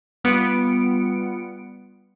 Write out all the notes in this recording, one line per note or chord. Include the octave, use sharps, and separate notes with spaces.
G3 B3 F4 C#7 D7